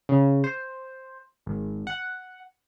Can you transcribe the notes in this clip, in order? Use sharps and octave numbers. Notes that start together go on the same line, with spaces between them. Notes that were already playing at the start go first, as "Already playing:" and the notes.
C#3
C5
G#1
F#5